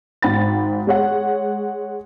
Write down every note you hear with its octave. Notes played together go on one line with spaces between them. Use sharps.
G#1 G#2 G5 B5 A6
G#3 C#5 F#5